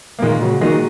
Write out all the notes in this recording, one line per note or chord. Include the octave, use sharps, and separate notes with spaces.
A#3
A#2 D#3 G#3
C#3 F#3
A#2 D#3 G#3 D#4 F#4